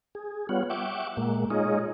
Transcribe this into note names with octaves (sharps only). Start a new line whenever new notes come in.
G#4
G3 B3 F4 C#5 F#5
E5 F#5 G5 C#6 D6
A#2 G#3 A#3
G#3 D#4 F4 G#4 C#5 D#5